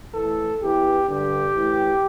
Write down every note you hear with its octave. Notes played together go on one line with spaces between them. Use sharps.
A2 E3 A4
E2 E3 G4
G2 D3 G4
A2 E3